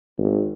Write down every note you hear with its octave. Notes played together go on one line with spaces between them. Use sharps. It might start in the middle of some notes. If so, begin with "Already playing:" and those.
G#1